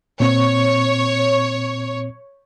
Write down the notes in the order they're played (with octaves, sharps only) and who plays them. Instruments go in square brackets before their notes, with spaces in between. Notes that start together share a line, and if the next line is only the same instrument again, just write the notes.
[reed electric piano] A#2 C4 [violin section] C#5